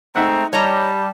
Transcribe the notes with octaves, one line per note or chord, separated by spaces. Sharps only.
G#3 A3 C4 D#4 E5 F#5 A#5
G3 C#5 D#5 A5 A#5